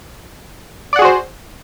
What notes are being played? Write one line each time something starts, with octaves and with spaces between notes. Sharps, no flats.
F#4 G#4 C5 D5 F#5